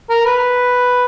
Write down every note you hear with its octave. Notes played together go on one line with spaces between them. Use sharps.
A#4
B4